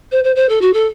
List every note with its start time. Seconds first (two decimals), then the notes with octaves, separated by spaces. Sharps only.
0.12 C5
0.24 C5
0.36 C5
0.49 A4
0.61 F#4
0.73 A4